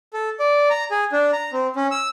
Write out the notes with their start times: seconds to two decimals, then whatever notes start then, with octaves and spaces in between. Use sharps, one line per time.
0.13 A4
0.40 D5
0.70 A#5
0.91 G#4
1.12 D4
1.33 A#5
1.52 C4
1.76 C#4
1.91 E6